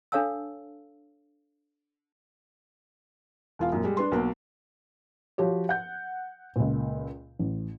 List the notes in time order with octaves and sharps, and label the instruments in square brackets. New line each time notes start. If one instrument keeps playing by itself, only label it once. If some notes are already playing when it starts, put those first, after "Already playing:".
[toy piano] D4 A4 C#5 F5 A5 E6
[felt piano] E1 F4 F5
F#2 A#2
G3 G#3
D4 B4 C6
B1 F#3 A#3
F3 F#4 G4 C#5
F#5 G6
C#2 A#2
A1